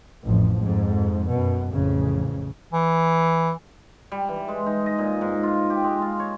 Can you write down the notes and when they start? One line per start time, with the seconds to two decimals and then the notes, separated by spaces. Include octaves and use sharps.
0.25 A1 F2 F3
0.58 F2 G#2
1.28 F#2 B2
1.72 A1 F2 C#3
2.73 E3
4.12 G3
4.29 E3
4.48 G#3
4.66 D#4
4.86 D#5
4.99 A#2
5.21 G#2
5.43 F4
5.70 G4
5.84 G#3
6.02 F4
6.20 C#5